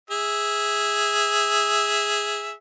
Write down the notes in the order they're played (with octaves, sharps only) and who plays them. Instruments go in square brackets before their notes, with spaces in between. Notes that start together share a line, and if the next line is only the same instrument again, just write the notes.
[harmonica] G#4 E5